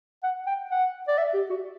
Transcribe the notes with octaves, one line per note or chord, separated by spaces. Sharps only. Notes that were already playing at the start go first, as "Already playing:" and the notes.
F#5
G5
F#5
D5
E5
G4
F#4